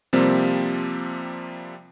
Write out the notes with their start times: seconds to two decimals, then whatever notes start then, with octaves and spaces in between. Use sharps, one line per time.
0.13 C3 F3 G3 A#3 C4